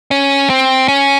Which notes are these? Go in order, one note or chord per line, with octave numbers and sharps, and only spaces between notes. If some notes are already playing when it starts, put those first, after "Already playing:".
C#4
C4
C#4